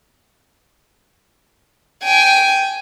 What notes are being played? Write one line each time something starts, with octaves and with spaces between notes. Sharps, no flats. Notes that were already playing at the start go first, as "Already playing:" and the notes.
G5 G#5